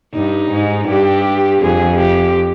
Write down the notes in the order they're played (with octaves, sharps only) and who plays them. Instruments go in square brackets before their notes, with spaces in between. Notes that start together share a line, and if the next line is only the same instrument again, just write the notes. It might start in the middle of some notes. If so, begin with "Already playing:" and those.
[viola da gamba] G2 [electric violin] D#4
[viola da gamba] G#2
[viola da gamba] G2 [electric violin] G4
[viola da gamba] F2 [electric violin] G#4
[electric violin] G4